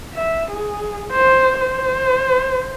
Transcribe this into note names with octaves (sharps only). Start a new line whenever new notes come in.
E5
G#4
C5
C5